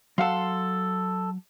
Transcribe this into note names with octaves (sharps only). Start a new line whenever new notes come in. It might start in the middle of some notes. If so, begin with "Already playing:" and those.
F#3 A4 F5 F#5 C6